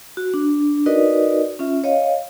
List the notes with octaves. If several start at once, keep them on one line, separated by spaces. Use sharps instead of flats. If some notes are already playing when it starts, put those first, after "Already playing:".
F#4
D4
D#4 F#4 A#4 B4 D5 D#5
C#4 F4 E5
C#5 D#5 F5